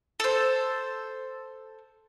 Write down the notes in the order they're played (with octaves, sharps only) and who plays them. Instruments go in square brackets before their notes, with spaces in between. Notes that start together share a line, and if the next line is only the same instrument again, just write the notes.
[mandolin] A4 C5